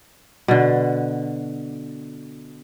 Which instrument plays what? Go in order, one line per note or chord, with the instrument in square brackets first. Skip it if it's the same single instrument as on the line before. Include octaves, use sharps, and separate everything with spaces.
[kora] B2 D3